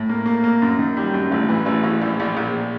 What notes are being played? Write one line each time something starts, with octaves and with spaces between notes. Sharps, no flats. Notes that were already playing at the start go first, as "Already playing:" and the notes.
Already playing: A2
A#3
A#3
A#3
F#2
D#3
G3
F#2
A1
E3
A1
A1
A#1
A#1
A#1